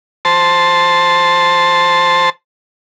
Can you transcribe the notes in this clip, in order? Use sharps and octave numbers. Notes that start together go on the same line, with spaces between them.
C5 A5